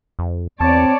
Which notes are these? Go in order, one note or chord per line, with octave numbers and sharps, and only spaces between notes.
F2
E2 C4 C#5 D5 A5